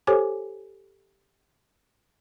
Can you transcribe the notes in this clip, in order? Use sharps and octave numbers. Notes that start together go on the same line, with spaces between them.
G4 A4 C5 C#5 G#5 D6